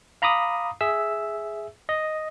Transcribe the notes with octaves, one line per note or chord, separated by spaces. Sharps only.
F5 A#5 B5 D6 D#6
G#4 E5 E6
D#5